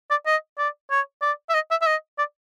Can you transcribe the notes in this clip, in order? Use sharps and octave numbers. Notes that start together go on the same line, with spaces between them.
D5
D#5
D5
C#5
D5
E5
D#5
E5
E5
D#5
D5